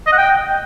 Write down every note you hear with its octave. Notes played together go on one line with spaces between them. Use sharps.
D#5
F#5
G5